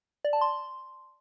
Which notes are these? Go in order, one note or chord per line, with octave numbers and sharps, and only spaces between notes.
D5
A5
C6